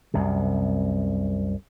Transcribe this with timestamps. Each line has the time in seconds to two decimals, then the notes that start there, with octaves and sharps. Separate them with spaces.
0.14 C2 F#2 C3